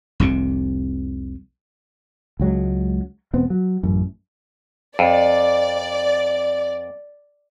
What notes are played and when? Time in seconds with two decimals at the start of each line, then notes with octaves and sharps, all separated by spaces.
0.20 F1 C2 C3
2.40 C#2 F#3 G#3
3.33 E1 B3 C4
3.50 F#3
3.83 A1 F#2
4.99 F2 D5